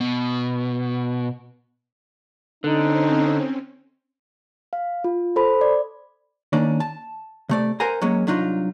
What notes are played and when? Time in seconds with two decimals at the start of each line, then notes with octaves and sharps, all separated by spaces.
0.01 B2
2.64 D3 C4 C#4 D#4
4.73 F5
5.04 F4
5.36 A4 C5 B5
5.61 D5
6.53 D#3 A#3 C#4 D4 D5
6.80 A5
7.49 C3 A3 D5
7.80 A#4 C5 F#5 G#5 A#5
8.02 F#3 G#3 A#3 C#4
8.27 C2 F#3 D4 D#4 F4